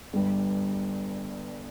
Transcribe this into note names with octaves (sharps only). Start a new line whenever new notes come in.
G1 G2 G3